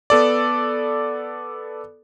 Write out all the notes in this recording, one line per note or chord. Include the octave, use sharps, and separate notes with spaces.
B3 A4 D5